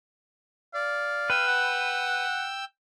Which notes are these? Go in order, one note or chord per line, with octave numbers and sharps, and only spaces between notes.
D5 F5
B4 G5 E6
F#5